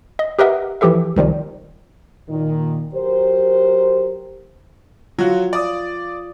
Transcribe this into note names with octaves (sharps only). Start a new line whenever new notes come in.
D#5
G4 A#4 B4 D#5 E5 F#5
E3 F3 G4 A4 E5
C2 D#3 F3 G3
A#2 D#3
F#3 G4 A#4 C5
F#3 F4 F#4
D5 D#6